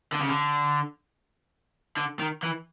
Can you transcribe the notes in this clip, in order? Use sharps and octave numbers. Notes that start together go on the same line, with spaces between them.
D3
C#3
D3
D3
D#3
E3